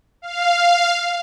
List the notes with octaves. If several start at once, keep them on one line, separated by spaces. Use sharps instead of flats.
F5